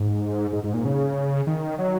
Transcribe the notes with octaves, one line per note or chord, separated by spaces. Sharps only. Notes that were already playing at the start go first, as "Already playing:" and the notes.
Already playing: G#2
G#2
G#2
A#2
C#3
D#3
F#3